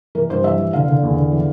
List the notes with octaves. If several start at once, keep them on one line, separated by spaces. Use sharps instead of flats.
E3 A#4
G2 C5
E3 E5
E3
D3 F5
D3
E2
D3
E3